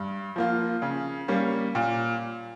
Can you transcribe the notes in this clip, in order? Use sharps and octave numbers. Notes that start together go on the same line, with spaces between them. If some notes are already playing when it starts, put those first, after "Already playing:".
Already playing: G2
F3 A#3 F4
C#3
G3 A#3 C#4
A#2